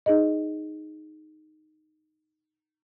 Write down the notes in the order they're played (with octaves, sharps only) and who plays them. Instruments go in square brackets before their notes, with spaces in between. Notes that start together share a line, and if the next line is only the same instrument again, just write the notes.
[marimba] D#4 G#4 D#5